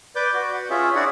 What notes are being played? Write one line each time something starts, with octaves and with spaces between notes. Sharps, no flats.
B4 D5 D6 G6
F#4
F#5
C#4 F4 G#4 E5
D4 E4 F#4 G#4 D5 F#5